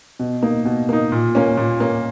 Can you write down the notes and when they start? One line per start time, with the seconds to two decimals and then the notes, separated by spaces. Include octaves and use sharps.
0.19 B2
0.42 A#3 D#4
0.65 B2
0.89 A#3 D#4
1.12 A#2
1.35 A#3 C#4
1.57 A#2
1.80 A#3 C#4